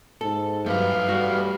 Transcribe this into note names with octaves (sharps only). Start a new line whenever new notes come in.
G#2 A4
G2 F#3 A3 B4 F5
G3 F#4